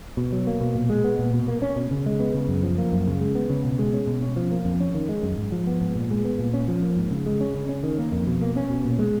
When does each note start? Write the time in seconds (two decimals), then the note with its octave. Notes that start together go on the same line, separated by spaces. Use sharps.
0.17 B2
0.32 F#3
0.47 A#3
0.61 B2
0.75 A#2
0.90 G#3
1.04 B3
1.19 A#2
1.33 B2
1.48 A#3
1.62 C#4
1.76 B2
1.91 C#3
2.06 G#3
2.20 B3
2.34 C#3
2.48 F#2
2.63 F3
2.78 A#3
2.92 F#2
3.07 C#3
3.21 G#3
3.35 B3
3.50 C#3
3.64 B2
3.79 G#3
3.94 C#4
4.07 B2
4.22 C#4
4.36 F3
4.51 A#3
4.65 F2
4.80 C#4
4.94 D#3
5.09 G#3
5.23 F#2
5.38 G#2
5.52 F3
5.67 B3
5.81 G#2
5.96 A#2
6.11 G#3
6.25 B3
6.39 A#2
6.53 C#4
6.68 F3
6.82 A#3
6.97 G#2
7.11 C#3
7.26 G#3
7.41 C#4
7.55 C#3
7.69 C#4
7.83 D#3
7.98 A#3
8.12 F2
8.27 B2
8.42 A#3
8.56 C#4
8.70 B2
8.85 A#2
8.99 G#3